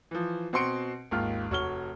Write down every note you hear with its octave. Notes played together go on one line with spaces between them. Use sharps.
E3 F3
B2 C4 F#4 C6 C#7 D7
G#1 D#2 G#3 F4 F6
F1 F#4 C#5 F6 G7